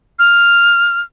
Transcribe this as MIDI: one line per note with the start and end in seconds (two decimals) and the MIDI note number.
0.19 1.01 89